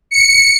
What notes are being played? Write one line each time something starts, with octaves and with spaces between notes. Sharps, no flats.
C#7